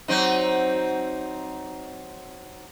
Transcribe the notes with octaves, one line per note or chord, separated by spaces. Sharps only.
F#3 C4 D#4